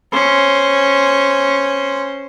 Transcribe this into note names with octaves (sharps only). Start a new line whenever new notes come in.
C#4 C5